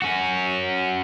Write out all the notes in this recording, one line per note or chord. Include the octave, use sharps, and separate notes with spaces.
C#4 F#4